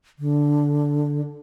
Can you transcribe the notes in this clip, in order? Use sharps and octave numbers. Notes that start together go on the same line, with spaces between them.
D3